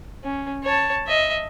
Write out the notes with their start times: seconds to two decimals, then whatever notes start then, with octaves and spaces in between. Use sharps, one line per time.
0.24 C#4
0.63 C#5 A5
1.07 D#5 E5